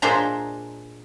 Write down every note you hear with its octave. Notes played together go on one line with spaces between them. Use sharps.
A#2 G#3 D4 C5 E5 A#5